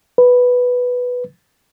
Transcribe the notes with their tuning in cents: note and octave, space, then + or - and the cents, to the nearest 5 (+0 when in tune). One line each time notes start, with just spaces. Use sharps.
B4 +0